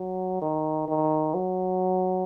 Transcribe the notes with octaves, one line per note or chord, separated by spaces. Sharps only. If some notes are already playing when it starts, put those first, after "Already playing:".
Already playing: F#3
D#3
D#3
F#3